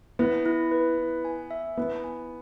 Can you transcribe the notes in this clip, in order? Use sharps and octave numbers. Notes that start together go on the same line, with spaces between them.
B3 E4
E4
B4
E4
G#5
E5
B3 E4
G#5